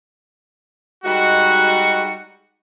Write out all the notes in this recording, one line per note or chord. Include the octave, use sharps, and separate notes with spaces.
G3 G#3 D#4 F#4